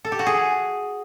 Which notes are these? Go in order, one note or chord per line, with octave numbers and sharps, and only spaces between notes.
A4
G4
F#4
G#4